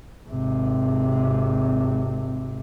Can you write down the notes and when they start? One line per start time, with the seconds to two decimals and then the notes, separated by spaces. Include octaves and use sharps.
0.29 G#1 C3